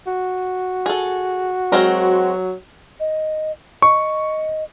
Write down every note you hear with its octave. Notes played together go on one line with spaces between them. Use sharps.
F#4
G#4 A4
F#3 G#3 C4 A#4
D#5
D#5 C#6